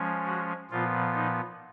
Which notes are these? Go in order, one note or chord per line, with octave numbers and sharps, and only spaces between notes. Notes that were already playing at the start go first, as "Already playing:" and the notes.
Already playing: F3 G#3 C#4
F#4
A#2 F3 B3 F4
D#4